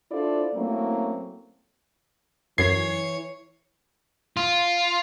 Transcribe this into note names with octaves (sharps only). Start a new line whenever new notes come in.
D4 E4 F4 A4 C5 D5
F#3 A3 A#3 C4 C#4 E4
F#2 E3 C#5 G#6 C7
F4